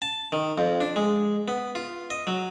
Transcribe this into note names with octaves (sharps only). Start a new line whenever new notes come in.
A5
D#3
F2
D4
G#3
B3
F4
D#5
F#3